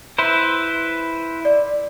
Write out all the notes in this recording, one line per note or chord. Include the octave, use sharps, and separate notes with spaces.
E4 B4 C5
D5